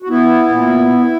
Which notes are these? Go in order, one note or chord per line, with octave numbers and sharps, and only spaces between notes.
F#4
B3 E4
A#2